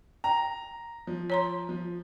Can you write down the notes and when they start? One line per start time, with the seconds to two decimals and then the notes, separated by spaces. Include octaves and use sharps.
0.24 G5 A#5
1.07 F3
1.30 C#5 A#5 C6
1.69 F3